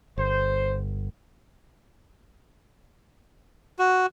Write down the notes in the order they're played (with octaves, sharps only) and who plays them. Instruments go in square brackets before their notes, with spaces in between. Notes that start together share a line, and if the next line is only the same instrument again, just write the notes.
[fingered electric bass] G1 [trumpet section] C5
[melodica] F#4